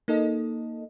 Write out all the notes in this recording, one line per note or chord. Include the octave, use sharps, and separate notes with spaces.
A#3 D#4 A4 D#5